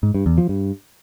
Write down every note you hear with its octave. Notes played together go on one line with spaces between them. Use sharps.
G#2
G2
E2
F3
G2